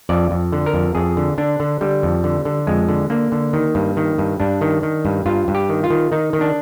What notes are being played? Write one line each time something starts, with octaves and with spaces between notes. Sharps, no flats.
F2 D5
F2
D3
A#4
F2
F2 G#4
D3
D3 D4
D3
D3 G3
F2
D3
D3
F2 G#3
D3
D3 A#3
D3
D#3
G2
D#3
G2
G2 D4
D#3
D#3
G2
G2 F4
G2
G4
D#3
F4
D#3
D#3 D#4
D#3
D4